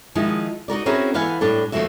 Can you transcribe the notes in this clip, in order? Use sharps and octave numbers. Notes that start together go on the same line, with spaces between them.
D#3 F3 G#3 D#4 E4
D#4 F#4 A#4 D5
C4 C#4 E4 F#4 G#4 A#4
D3 E3 B4 F5 F#5 G#5
A2 G3 D4 A4
D#2 B2 F3 A3 F#4 E5